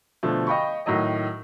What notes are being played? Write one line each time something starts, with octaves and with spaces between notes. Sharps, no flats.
B2 D3 F3 A3
D#5 F5 G5 B5 C#6
A2 D#3 F#3 D#5